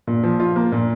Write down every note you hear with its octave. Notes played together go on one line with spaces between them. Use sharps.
A#2
F3
F4
A#3
A#2